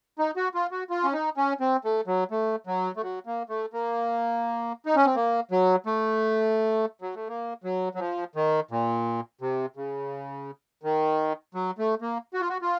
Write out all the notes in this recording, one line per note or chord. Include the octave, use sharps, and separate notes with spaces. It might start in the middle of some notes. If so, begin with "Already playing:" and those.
D#4
F#4
F4
F#4
F4
C#4
D#4
C#4
C4
A3
F#3
A3
F#3
A3
F#3
A#3
A3
A#3
D#4
C#4
C4
A#3
F#3
A3
F#3
A3
A#3
F#3
F#3
F3
D#3
A#2
C3
C#3
D#3
F#3
A3
A#3
F#4
F4
F#4
F4